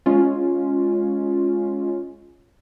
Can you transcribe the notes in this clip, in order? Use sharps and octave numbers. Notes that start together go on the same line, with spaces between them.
G#3 C#4 F4